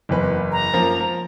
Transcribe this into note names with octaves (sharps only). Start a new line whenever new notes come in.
F#1 E2 B4
A#5
F#2 F3 A#3
F3